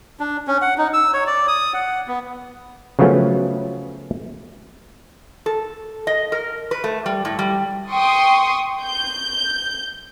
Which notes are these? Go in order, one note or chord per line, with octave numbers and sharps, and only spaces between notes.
D4
C#4
F#5
D#4
E6
C#5
D5
D#6
F#5
B3
C#3 F3 F#3 A3 B3 C#4
A4
D#5
A#4
B4
A3
G3
A2
G3
G5 C6 C#6 D#6
G6